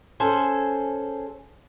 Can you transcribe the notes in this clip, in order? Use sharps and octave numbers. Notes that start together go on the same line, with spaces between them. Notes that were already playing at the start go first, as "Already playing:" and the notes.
C#4 G#4 A4 C5 G#5